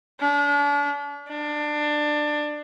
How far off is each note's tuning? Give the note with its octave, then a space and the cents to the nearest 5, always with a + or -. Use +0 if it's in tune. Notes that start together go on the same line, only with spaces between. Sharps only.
D4 -40
D4 +20